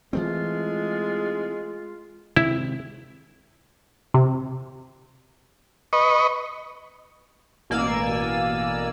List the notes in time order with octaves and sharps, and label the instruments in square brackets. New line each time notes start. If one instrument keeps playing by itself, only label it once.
[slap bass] E3 A3 C4 [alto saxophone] G#3 [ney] F4
[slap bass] C3 D#3 G#3 [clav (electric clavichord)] E4
[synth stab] C3
[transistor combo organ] B4 D#5 C#6
[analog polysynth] A1 B2 A#3 D5 G#5 E6